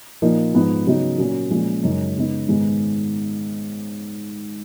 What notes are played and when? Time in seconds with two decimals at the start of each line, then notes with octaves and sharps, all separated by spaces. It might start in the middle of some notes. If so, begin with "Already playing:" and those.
0.22 A#2 F3 A#3 D#4
0.54 G#2 F3 B3 D#4
0.87 C#3 F#3 B3 D#4
1.18 A#2 F#3 A#3 C#4
1.50 A#2 F3 G#3 C#4
1.83 F#2 C#3 G#3 D#4
2.16 C#3 G#3 B3 D#4
2.48 G#2 D#3 G#3 B3 D#4